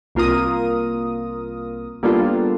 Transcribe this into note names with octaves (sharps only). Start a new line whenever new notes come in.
C2 A#3 F4 A#4 D#6
G3 A#3 B3 D4 F4 A4